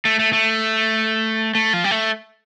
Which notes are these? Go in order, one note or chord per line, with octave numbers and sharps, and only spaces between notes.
A3
A3
A3
A3
F3
G3
A3